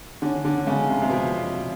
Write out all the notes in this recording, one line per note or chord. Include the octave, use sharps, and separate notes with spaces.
D3 C#4
D3
C#3 G#3
C3
C3
B2 F3
F4